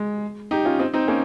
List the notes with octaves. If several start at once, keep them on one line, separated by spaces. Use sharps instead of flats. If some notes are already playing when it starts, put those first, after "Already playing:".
Already playing: G#3
D#4 G4
C#4 F4
C4 D#4
C4 D#4
A#3 C#4